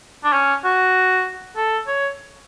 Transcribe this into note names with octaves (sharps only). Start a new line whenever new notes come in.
D4
C#4
F#4
A4
C#5